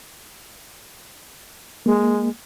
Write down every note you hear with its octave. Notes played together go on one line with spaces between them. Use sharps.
G#3 A#3